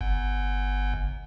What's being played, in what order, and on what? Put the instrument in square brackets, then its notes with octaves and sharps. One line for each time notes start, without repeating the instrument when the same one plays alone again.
[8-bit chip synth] G1